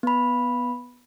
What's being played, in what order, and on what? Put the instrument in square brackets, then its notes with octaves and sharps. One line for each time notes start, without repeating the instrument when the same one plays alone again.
[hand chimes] B3 B5